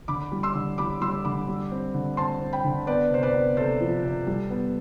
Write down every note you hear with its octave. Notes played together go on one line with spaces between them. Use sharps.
D3 B5 D6
G3
C6 E6
D3
G3 B5 D6
G3 C6 E6
D3 B5 D6
G3
C4
D3
C4 A5 C6
C4
G5 B5
D3
B3 B4 D5
C3 C5
B4 D5
B3
C3 A4 C5
F3
C3
G3
B3